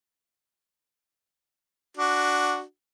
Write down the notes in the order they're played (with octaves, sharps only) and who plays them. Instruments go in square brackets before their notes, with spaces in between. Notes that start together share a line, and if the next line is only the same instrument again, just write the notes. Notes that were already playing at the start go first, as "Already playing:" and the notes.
[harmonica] D4 F#4